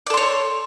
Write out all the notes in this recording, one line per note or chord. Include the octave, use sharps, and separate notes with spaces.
A4 C#5 D5 C6